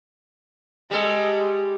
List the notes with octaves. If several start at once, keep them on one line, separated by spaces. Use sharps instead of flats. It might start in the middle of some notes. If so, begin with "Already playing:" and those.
G3 G#3 A4